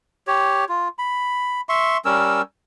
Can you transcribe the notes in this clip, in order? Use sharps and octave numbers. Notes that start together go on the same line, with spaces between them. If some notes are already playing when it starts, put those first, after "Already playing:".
G4 C#5
F4
B5
E5 C6 C#6
G3 C#4 A#4 E6